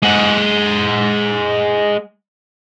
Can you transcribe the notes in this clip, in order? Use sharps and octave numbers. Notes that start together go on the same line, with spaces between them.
G#3 F#5